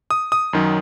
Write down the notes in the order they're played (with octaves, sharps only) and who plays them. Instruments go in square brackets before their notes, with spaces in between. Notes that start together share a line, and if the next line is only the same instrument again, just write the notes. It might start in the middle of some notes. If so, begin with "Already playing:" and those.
[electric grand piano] D#6
D#6
F#2 D#3 F#3